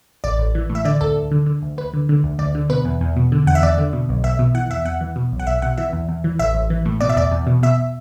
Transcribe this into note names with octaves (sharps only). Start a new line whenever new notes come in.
A1 D5
A1
E3
A2
E5
D3 D5
D2 A4
D2
D3
D3
D2
D2 B4
D3
D3
D2
D2 D5
D3
B2 B4
E2
E2
B2
D3
E2 F#5
E5
E2 D5
D3
B2
B1
B1 E5
B2
E3 F#5
E2 E5
E2 F#5
E3
B2
B1
F#5
B1 E5
B2 F#5
E3 E5
E2
E2
E3
A1 E5
A1
E3
A2
B2 D5
E5
E2 D5
E2
B2
B2 E5